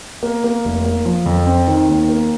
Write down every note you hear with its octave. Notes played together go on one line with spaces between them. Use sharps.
A#3
A#3
F1
A#3
F3
F2
C4
D#3
D#2
A#3